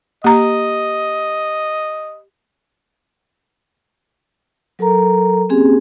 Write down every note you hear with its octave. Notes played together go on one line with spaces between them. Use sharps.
A#3 G4 D#5 A#5
F#3 A4 A#4 A#5
A#3 C4 C#4 G4 G#4 G#5